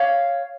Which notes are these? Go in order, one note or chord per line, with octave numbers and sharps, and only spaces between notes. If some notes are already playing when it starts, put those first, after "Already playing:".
Already playing: C#5 F5